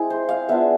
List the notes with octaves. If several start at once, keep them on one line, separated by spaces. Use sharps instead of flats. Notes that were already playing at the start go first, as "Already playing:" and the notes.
Already playing: G#3 C4 E4 G#4
C5
F5
B3 D4 F4 E5